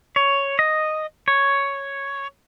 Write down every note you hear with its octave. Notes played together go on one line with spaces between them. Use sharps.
C#5
D#5
C#5